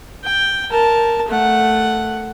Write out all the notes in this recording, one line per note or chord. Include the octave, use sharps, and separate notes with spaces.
G5
A#4 A5
A3 F#5